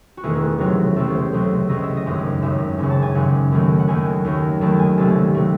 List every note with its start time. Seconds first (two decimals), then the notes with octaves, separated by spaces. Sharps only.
0.17 F#4
0.23 E1 E2 D#3 A3 G#4
0.58 C#2 C3 F#3 A3
0.96 C#2 C3 F#3 A3 A4
1.14 C5
1.33 C#2 C3 F#3 A3
1.69 C#2 C3 F#3 A3 D#5
1.83 E5
1.97 D#5
2.06 G#1 F#2 C#3
2.42 G#1 F#2 C#3 E5
2.79 G#1 F#2 C#3
2.90 A5
3.03 G#5
3.15 G#1 F#2 C#3 F#5
3.52 D#2 D#3 F#3 A3
3.80 F#5
3.88 D#2 D#3 F#3 A3 G#5
4.25 D#2 D#3 F#3 A3
4.61 D#2 D#3 F#3 A3 A5
4.79 G#5
4.98 C2 C3 F#3 A3 A5
5.34 C3 F#3 A3